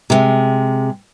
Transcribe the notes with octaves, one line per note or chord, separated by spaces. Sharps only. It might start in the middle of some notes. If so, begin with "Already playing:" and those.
C3 G#3